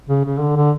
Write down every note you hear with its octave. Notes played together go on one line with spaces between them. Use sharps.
C#3
C#3
D3
D3